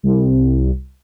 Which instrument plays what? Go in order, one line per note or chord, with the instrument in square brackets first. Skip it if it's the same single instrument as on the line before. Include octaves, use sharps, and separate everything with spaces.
[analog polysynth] C2